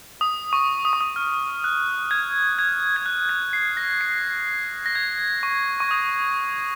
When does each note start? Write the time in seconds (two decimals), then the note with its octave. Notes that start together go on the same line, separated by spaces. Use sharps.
0.21 D#6
0.53 C#6
0.85 D#6
0.93 C#6
1.01 D#6
1.16 F6
1.64 F#6
2.11 G#6
2.59 G#6
2.96 G#6
3.06 F#6
3.29 G#6
3.53 C7
3.77 A#6
4.01 C7
4.86 A#6
4.95 G#6
5.43 C#6
5.80 C#6
5.91 D#6